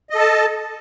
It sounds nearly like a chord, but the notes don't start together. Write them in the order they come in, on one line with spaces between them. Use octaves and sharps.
D#5 A4 A5